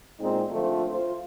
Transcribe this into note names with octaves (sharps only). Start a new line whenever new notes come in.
A#2 G#3 C4 D#4
D3 F3 A3 C4 F4
F4 C5